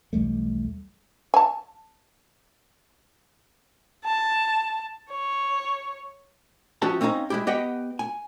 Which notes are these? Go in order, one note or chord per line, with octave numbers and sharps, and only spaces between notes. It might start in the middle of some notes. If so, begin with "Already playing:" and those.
B1 E2 G3 A3
G#5 A5
A5
C#5
F3 C#4 F#4 G4 E5 A5
C4 C#4 D#4 F5 A#5
G#3 E4 G4
B3 G4 D#5 F#5 G5
G#5